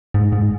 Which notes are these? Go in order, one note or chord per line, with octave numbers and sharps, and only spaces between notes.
G#2
G#2